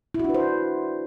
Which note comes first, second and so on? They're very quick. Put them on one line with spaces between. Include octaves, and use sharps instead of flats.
E4 F#4 D4 B4 C5